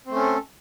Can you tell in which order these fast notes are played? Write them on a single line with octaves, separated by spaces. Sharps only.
C4 A3 C#4 A4